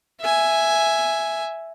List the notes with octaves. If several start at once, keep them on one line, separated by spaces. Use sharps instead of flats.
E5 G#5